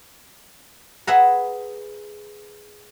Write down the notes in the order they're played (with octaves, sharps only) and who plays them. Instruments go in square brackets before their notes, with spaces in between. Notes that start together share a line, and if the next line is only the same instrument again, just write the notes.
[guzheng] G#4 B4 E5 F#5 A#5